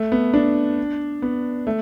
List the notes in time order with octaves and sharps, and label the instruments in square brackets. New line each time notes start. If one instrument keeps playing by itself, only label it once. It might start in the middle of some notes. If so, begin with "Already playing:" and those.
Already playing: [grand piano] A3
B3
D4
B3
A3